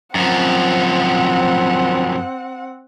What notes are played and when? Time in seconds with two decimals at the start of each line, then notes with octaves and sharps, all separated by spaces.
0.15 F#2 F3 C4 F#5